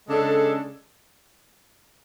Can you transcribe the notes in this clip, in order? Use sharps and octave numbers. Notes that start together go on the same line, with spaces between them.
C#3 G#3 D4 A4